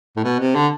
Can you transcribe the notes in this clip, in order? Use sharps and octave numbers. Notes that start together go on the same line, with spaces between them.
A2
B2
C3
D3